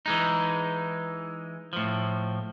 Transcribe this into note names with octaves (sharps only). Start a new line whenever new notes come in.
E3 G#3 D#4
A2 F3